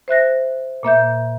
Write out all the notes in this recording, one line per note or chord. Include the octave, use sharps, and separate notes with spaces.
C5 E5 F#6 A#6
A#2 A#3 E5 G6